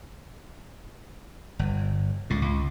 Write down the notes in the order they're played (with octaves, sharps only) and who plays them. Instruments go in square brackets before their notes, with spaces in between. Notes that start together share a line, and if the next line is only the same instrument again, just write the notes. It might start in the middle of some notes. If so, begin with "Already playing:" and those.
[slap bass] G1
C#2 A2
C#2